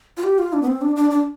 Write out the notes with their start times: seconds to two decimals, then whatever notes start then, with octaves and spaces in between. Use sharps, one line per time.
0.17 F4
0.24 G4
0.39 F4
0.53 D4
0.62 B3
0.67 C4
0.82 D4
0.96 D4
1.11 D4